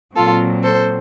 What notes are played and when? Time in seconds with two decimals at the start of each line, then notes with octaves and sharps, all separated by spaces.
0.16 A#2 F#3 C4 F4 A4
0.63 A4 C5